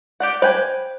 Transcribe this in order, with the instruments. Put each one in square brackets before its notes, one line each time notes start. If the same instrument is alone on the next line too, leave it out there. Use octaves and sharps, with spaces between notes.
[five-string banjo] G4 D5 F#5
[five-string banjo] B4 G5 G#5 [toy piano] C5